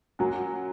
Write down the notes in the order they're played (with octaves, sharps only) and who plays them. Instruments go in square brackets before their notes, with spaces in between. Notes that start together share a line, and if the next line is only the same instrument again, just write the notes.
[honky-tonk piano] F#3 [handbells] C#4 F4 A#4